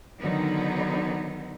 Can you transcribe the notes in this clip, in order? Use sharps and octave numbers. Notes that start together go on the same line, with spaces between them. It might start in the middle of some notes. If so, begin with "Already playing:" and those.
D3 D#3 F#3 B3 D#4